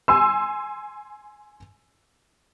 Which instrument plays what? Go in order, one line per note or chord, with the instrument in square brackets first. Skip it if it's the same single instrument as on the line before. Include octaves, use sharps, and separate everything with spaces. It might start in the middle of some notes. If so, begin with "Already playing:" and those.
[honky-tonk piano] G#5 C6 E6